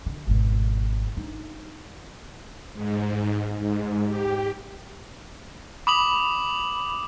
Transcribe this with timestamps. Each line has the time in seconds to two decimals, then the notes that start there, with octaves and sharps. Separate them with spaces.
0.06 D3
0.27 G#1 B2
1.17 D4 D#4
2.74 G#2
3.58 G#2
4.06 G4
5.87 B5 D6 D#6 F#7